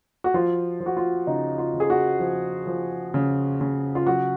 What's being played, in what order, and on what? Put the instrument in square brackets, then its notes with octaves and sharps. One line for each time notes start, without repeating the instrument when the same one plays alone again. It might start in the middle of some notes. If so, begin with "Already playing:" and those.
[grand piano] F#4
F3 F4
F3
F#4
F4
C#3 D#4
F4
C#3
G#4
F#4
F3
F3
C#3
C#3
F4
F#3 F#4